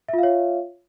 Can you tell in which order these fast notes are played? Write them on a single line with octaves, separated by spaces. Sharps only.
E5 F4 F5 C#5